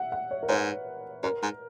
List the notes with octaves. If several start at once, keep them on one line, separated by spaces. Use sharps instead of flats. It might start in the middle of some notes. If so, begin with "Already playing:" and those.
Already playing: E5 F#5
F#5
C#5
A#4
G#2 B4
F#2 A#4
G#2